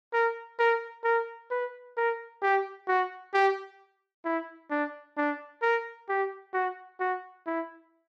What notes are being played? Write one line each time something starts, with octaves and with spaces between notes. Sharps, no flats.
A#4
A#4
A#4
B4
A#4
G4
F#4
G4
E4
D4
D4
A#4
G4
F#4
F#4
E4